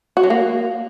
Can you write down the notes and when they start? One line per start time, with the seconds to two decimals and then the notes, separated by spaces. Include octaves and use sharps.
0.17 F#4
0.23 F#3
0.30 A#3